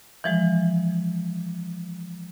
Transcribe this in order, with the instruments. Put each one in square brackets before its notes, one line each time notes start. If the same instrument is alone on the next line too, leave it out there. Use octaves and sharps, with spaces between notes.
[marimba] E3 F3 G#3